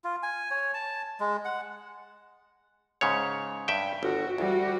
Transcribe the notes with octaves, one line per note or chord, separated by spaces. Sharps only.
F4
G#5
C#5
A5
G#3
F#5
G#2 C#3 C#5
G2 E5 G5
G1 F#4
D2 G3 F#4